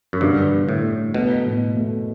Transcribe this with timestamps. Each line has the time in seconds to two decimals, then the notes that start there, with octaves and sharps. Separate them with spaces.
0.13 F#2
0.21 G2 D3
0.52 D3
0.69 A2
0.83 A3
1.14 B2 A3
1.46 A2
1.77 A3